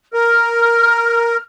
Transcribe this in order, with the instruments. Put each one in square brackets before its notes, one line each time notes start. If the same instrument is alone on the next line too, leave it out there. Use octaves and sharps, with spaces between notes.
[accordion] A#4 [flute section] F6